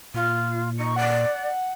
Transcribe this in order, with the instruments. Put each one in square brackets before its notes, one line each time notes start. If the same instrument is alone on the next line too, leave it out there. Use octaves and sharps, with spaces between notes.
[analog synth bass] A#2 [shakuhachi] F4
[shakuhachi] D#4 [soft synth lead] C#6
[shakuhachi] D5 [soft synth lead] F#5